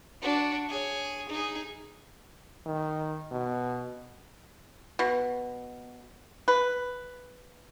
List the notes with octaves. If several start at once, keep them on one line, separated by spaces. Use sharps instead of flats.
D4 F#4
G#4 C#5
D#4 G#4
D#3
B2
B2
B4